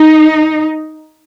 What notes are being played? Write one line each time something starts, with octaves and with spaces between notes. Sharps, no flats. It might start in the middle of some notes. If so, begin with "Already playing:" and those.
Already playing: D#4